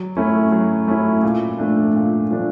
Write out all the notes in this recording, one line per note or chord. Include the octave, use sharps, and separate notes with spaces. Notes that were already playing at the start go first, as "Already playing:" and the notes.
Already playing: F#3
A3 C#4 E4
F#3
A3 C#4 E4
A#2
F3 A3 D4
A#2
F3 A3 D4